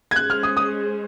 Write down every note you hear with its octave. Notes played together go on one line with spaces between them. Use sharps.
G#6
G#3 C#4 G#4 C5 F#6
F6
D#6
D#6